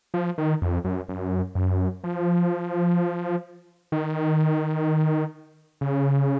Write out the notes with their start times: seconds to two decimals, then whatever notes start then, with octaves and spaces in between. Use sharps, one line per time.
0.14 F3
0.38 D#3
0.62 F2
0.85 F#2
1.09 F#2
1.55 F#2
2.04 F3
3.92 D#3
5.81 C#3